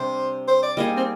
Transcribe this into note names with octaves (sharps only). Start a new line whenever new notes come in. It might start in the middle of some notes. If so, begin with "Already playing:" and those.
Already playing: C3 G3 D4 C5
C5
D5
G3 A#3 D#4 G#4 D#5
C4